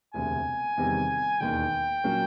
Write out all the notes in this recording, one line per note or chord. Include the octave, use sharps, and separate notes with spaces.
E1 D2 C3 G#5
E2 C3 D#3 G3
E1 D#2 D#3 G5
A#2 F#3 A#3 C#4